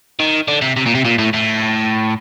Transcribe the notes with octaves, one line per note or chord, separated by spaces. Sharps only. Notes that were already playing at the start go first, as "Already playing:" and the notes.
D#3
D3
C3
C3
A#2
C3
A#2
A2
A2